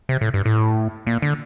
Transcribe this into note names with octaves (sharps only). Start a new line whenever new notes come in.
C3
A2
G2
A2
A#2
D3